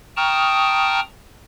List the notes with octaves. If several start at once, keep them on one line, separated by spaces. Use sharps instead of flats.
G5 A5 A#5 C#6 D#6 F6